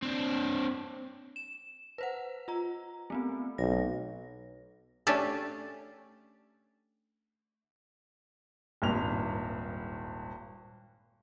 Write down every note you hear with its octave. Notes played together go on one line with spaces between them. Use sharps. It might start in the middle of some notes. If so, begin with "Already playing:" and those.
C4 D4
E7
B4 C5 F#5
F4 A#5
A3 B3 C4
B1 A#6
A3 C#4 D4 G4 A4
D#1 G#1 G2 F7